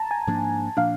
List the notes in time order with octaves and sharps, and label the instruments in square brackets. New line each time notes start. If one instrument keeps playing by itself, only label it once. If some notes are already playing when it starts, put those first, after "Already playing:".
Already playing: [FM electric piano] A5 A#5
G#5
[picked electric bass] G#2 F3 A#3 D4
[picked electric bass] A#2 F3 A#3 D4 [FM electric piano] F5